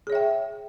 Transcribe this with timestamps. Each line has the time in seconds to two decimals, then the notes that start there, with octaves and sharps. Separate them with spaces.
0.07 G#4
0.10 C#5
0.12 E5
0.15 G5